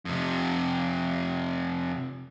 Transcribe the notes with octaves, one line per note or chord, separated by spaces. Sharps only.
F2 C3